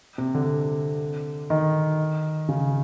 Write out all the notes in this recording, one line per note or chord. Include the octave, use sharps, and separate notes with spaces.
C3
D3
D#3
C#3